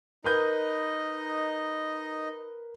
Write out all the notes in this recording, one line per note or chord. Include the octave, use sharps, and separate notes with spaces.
D#4 A#4 B4 D#5 G6